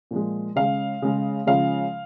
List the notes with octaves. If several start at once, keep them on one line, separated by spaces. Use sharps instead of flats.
A#2 F3 G#3
C#3 G#3 F5
C#3 G#3
C#3 F3 G#3 F5